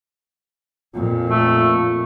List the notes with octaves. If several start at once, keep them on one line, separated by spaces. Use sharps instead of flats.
F2 A#2 F4
A3 F4